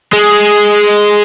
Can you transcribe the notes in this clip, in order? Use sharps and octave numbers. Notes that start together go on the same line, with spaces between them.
G#3